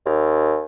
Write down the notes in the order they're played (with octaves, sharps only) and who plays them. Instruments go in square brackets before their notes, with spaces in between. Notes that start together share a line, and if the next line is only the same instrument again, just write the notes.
[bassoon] D#2